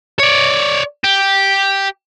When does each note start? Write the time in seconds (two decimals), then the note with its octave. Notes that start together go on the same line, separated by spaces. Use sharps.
0.19 C#5 D5
1.04 G4